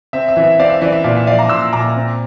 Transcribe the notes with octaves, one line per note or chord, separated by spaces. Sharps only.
C4 E5
E5
E3
E5
C4 D5 F5
E5
E3 D5
E5
A#2 D5 F5
E5
F3 D5 F5
A#5 D6
A#2 C6 E6
A#2 A#5 D6
C4